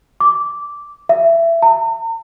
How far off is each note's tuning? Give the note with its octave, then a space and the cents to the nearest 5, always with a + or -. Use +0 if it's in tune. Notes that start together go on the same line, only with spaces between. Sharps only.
D6 -10
E5 +20
A#5 -45